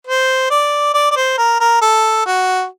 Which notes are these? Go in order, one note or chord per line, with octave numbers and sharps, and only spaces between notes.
C5
D5
D5
D5
C5
A#4
A#4
A4
F#4